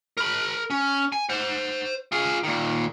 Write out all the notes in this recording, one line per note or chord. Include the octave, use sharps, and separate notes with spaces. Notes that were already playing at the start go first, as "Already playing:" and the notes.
A#4 B5
C#4
G#5
C5 F#5
F4 G#4
A#2 D#3